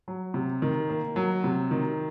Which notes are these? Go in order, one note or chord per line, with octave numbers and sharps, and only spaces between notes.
F#3
C3
D#3
A#3
F#3
C3
D#3